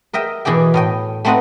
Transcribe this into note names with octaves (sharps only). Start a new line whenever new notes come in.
A#4 D#5 E5 G5
B2 E3 G#4 D5 G5
A2 D#5 G5
A3 B3 C4 D#4 D#5 F#5